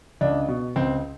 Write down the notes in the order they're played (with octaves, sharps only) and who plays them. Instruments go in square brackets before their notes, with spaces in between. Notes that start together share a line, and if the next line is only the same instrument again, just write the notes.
[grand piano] C#2 D4
B2
C#2 C4